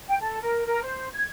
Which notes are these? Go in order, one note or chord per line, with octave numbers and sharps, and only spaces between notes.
G5
A4
A#4
A#4
C5
G#6